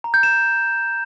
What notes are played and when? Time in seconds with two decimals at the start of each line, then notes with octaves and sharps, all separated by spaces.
0.04 A#5
0.14 G6
0.23 E7